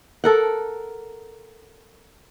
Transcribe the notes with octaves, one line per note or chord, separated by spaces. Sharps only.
A4 A#4 F#5